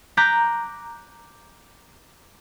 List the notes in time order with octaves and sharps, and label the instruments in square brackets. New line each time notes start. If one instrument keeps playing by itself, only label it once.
[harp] A#5 D6 F#6 G6 A#6 B6